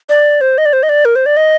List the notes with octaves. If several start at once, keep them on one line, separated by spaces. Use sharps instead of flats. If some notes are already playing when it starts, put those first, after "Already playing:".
D5
C5
D#5
D5
C5
D#5
D5
A#4
C5
D5
D#5